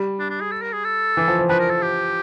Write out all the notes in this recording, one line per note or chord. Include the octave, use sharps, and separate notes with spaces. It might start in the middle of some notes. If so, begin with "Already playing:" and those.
Already playing: G3
D4
D4
G#4
A4
A#4
G#4
A4
E3
F3
F3
F3 B4
A#4
A4
G4